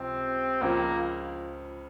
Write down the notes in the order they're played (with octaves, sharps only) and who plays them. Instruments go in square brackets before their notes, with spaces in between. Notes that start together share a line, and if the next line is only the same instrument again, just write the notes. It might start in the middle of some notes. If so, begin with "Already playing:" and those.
Already playing: [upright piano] C#2 C3 F3 [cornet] C4
[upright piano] C#2 C#3 F3 [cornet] A#3